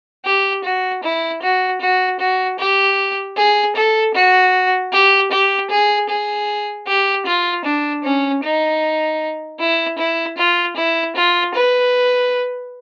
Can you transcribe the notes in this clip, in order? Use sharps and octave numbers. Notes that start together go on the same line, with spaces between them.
G4
F#4
E4
F#4
F#4
F#4
G4
G#4
A4
F#4
G4
G4
G#4
G#4
G4
F4
D4
C#4
D#4
E4
E4
F4
E4
F4
B4